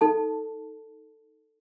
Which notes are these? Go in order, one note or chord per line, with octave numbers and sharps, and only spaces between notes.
D#4 A4 A5